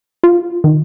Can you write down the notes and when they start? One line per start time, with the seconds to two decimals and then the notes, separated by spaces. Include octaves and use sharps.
0.24 F4
0.64 D#3